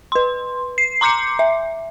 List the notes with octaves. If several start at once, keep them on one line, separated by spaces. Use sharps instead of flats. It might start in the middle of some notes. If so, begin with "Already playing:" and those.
B4 C6
C7
A#5 C6 D6 G6 C7 C#7
E5